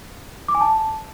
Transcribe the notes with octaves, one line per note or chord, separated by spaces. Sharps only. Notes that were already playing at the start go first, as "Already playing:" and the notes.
D6
G#5
A5